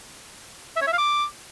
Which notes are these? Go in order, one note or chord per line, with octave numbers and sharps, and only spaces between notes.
E5
C#5
E5
F5
D6